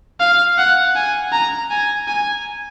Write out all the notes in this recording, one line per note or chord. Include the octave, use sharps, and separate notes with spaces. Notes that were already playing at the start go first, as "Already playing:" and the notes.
F5
F#5
G#5
A#5
G#5
G#5